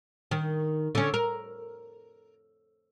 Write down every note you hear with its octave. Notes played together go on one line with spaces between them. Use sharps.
D#3
D3 C#4
A#4